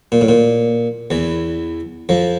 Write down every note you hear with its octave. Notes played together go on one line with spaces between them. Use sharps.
A#2
A2
A#2
E2 E3
F2 F3